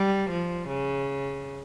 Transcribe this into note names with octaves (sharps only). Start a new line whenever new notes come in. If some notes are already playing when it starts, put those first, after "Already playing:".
Already playing: G3
F3
C#3